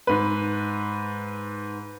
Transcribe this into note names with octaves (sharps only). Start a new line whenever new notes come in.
G#2 B4